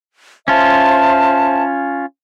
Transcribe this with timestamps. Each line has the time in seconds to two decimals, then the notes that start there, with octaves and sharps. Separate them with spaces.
0.48 C#4 F4 C5 E5 A5